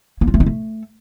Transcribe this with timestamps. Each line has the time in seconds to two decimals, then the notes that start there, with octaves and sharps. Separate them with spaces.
0.21 A#3
0.28 F4
0.34 A3
0.40 D#4
0.46 A3